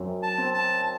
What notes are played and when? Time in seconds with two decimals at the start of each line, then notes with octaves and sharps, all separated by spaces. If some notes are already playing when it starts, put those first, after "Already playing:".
Already playing: F#2 C4
0.23 A5
0.38 C4
0.54 A5